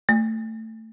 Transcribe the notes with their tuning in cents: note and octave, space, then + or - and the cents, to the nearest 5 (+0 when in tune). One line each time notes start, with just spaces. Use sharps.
A3 +15